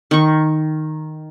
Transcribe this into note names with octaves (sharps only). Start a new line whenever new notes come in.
D#3 C#6